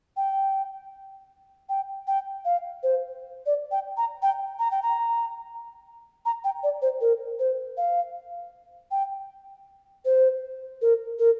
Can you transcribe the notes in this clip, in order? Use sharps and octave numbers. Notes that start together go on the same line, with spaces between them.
G5
G5
G5
F5
C5
D5
G5
A#5
G5
A#5
G5
A#5
A#5
G5
D5
C5
A#4
C5
F5
G5
C5
A#4
A#4